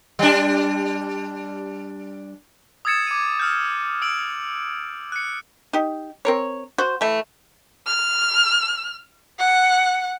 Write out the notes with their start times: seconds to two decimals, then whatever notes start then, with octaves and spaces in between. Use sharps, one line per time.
0.19 G3 D4
2.85 D#6 E6 G#6 A6 C#7 E7
3.07 D6 G#6 D#7
3.40 E6 F6 G6
4.02 E6 D7 F#7
5.12 F#6 C#7
5.73 D#4 G4
6.25 C4 A#4 C#5
6.78 F#4 C5
7.01 E3 A3
7.86 F6
9.39 F#5